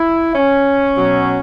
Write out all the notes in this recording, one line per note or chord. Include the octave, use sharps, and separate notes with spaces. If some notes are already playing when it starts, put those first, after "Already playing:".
Already playing: E4
C#4
B2 F#3